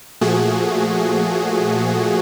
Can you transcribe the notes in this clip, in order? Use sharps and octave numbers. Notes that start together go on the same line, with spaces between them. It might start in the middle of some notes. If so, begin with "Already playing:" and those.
A#2 F3 A3 F#4 G#4